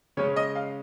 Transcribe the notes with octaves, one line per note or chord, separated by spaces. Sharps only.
C#3 G#3 C#4 C#5
D#5
F5